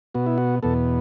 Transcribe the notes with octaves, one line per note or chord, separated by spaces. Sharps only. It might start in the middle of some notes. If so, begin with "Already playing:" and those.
B2 B3 F#4
E4
F#4
E2 B2 B3 A4